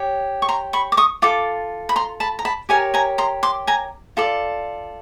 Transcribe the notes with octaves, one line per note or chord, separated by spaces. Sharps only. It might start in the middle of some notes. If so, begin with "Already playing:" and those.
Already playing: G4 C#5
C#6
A#5 C6
B5 C#6
D6
C#6 D#6
F4 A4 D6
B5
A#5 C6
A5 B5
A#5
A5 B5
G4 A#4 C#5 G#5 A#5
G#5 A#5
A#5 C6
C6 D6
G#5 A#5
F4 A4 D5